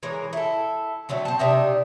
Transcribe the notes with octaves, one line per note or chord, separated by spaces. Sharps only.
E3 G#3 A#4 C#5
E4 A4
D3 F#3 A3 C4
C4 A5
C3 D4 D#4 E5